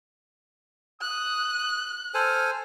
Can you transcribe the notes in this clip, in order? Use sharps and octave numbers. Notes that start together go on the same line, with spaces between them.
D#6 F#6
A4 C5 G#5 F6